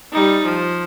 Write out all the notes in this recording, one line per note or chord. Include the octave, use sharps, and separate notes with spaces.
G3 D#4
F3